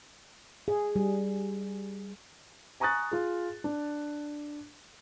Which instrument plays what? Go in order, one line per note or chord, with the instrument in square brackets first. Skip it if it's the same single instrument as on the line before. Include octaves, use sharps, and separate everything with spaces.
[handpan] G#4
G3
[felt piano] G#5 A#5 C#6 D#6 F#6 A6
F4 G#4
D4